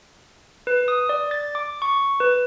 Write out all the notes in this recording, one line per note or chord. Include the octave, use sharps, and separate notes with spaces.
B4
D#6
D5
A6
D6
C#6
B4